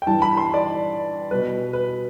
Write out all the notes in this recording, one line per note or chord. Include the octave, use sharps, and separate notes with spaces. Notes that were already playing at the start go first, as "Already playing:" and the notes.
G5
G2 E3 G3 A5
B5
C6
D5
B2 G3 B4
B4